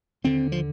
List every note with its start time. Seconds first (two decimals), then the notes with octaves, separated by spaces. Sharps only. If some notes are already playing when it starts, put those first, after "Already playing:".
0.24 D#2 D3 C4
0.52 F3